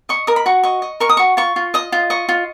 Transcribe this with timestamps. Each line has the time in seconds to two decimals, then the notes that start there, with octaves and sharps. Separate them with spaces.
0.09 D#5 C#6
0.27 A#4 D#6
0.36 B5
0.46 F#4 C#6
0.63 D#5 C#6
0.82 D#5
1.00 A#4 C#6
1.09 D#6
1.17 F#4 C#6
1.37 F4 C#6
1.56 F4
1.74 D#5 D#6
1.92 F4
2.10 D#5 C#6
2.29 F4